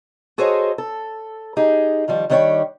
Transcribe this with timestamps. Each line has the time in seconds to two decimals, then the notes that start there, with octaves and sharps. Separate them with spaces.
0.38 F#4 G#4 A4 C5 C#5 D#5
0.78 A4
1.57 D#4 G4 G#4
2.08 D#3 F3 G3
2.30 D#3 G3 D4 C5 C#5 G5